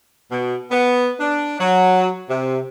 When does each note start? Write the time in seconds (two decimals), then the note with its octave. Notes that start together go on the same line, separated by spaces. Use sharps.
0.31 B2
0.71 B3
1.20 D4
1.60 F#3
2.29 C3